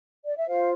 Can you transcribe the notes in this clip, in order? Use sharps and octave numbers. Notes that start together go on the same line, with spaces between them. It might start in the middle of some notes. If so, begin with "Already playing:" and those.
D5
E5
F4 C5 F5